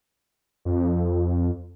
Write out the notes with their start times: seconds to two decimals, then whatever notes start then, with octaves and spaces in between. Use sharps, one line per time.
0.65 F2